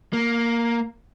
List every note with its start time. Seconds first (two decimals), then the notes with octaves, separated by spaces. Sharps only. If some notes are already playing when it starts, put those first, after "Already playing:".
0.13 A#3